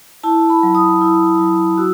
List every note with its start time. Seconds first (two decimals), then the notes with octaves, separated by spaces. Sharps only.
0.23 E4 A5
0.50 B5
0.63 F#3
0.75 D#6
1.02 E4
1.39 F#3
1.78 F#4 E6